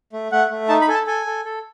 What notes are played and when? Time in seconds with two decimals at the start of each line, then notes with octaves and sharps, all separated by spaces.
0.13 A3
0.32 A3 F#5
0.50 A3
0.69 D#4 A5
0.81 B5
0.88 A4 G#5
0.94 A5
1.07 A4 G#5
1.26 A4
1.45 A4